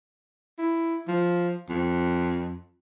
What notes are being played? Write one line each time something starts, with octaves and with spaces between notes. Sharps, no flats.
E4
F3
F2